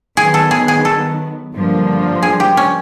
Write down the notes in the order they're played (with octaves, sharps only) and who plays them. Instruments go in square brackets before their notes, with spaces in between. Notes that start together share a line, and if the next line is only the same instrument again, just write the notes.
[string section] D#3 F#3 B3 [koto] G#4
[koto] A4
G#4
G#4
A4
[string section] G2 D3 F3 A#3
[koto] G#4
G4
C#4